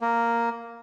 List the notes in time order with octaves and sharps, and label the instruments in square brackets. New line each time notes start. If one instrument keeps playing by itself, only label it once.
[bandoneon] A#3